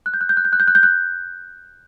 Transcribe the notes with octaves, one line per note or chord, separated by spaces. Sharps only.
F#6
G6
F#6
G6
F#6
G6
F#6
G6
F#6
G6
F#6